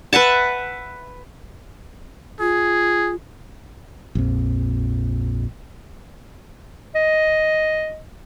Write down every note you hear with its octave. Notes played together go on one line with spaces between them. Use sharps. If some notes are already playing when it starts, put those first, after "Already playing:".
B4 E5 F#5 A5
F4 G#4
A#1 F2
D#5